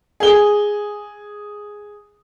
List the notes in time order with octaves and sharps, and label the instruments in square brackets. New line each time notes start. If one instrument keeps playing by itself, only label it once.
[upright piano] G#4 G7